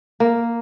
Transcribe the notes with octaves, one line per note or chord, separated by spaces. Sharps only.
A#3